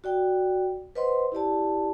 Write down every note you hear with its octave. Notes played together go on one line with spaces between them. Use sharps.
F#4 D5 G5
B4 C5 D#5 F#5 C6
E4 G4 D5 A5